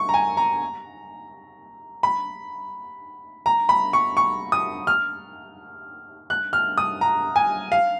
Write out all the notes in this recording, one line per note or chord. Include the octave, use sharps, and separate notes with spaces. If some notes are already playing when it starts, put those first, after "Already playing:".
Already playing: C#6
A#5
G#5
A#5
B5
A#5
B5
C#6
C#6
D#6
F6
F#6
F6
D#6
A#5
G#5
F5